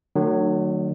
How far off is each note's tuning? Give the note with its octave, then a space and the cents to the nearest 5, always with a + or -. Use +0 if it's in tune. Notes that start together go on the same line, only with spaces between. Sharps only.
D#3 -45 F#3 +0 A3 +30